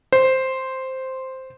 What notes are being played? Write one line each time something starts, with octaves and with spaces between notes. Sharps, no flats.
C5